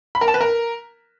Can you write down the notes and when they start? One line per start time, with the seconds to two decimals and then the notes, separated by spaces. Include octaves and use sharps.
0.15 B5
0.21 A#4
0.28 A5
0.34 B4
0.41 A#4